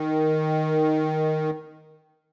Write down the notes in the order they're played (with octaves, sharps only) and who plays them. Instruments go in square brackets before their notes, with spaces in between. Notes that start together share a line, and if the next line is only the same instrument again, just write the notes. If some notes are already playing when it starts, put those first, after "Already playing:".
Already playing: [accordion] D#3